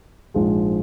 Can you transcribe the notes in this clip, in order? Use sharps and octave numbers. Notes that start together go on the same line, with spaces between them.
A#1 G#2 F3 G#3